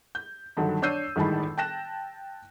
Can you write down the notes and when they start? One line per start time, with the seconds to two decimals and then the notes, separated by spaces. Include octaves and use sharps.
0.15 G6
0.57 G2 D3 D#3 F#3
0.82 D4 C#5 E6 G6 C7 D#7
1.16 G1 A2 D#3 G#3 A5 B5
1.58 G5 A5 F#6 A#6 E7